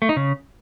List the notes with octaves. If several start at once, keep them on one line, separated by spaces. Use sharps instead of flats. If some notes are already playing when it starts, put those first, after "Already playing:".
A3
D#4
C#3